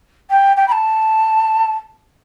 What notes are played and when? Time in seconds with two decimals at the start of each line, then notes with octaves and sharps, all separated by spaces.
0.30 G5
0.56 G5
0.67 B5
0.71 A5